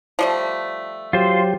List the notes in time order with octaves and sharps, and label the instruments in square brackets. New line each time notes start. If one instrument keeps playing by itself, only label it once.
[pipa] F3 G3 A3
[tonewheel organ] F#3 G4 [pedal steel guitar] F4 C5